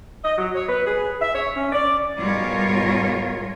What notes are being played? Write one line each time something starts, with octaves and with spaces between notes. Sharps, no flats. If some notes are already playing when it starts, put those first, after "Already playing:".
D#5
F#3
C#5
B4
G#4
E5
C#5
C#4
D5
G#2 B2 G3 F4 A#4 C#5